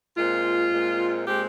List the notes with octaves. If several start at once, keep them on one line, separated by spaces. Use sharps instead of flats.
A#2 G#3 C4 F4
A#2 G#3 C4
A#2 G#3 C4 G4